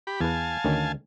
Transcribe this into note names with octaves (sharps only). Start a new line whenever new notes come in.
G4 B5
E2 B4 F5 G#5 A5
D2 D#3 C#4